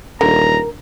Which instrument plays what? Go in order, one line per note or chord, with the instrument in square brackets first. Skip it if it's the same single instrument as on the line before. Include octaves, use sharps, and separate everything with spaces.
[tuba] D#1 [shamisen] D3 [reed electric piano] A#4 [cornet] A#5